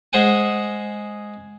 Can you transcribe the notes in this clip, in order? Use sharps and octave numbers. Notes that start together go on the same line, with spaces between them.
G#3 G#4 C5 F#5 G#5